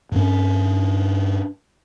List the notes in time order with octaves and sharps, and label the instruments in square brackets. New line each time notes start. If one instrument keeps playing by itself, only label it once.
[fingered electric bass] G2 C#4